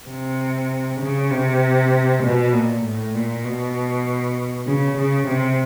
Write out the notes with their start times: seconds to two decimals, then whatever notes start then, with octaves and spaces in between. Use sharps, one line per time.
0.09 C3
1.00 C#3
1.31 C3
2.23 B2
2.53 A#2
2.84 A2
3.15 A#2
3.45 B2
4.67 C#3
4.97 C#3
5.27 C3